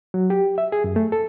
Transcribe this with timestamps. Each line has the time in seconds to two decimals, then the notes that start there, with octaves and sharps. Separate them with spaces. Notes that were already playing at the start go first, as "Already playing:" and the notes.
0.14 F#3
0.30 G4
0.58 E5
0.72 G#4
0.84 F#2
0.96 A3
1.12 A4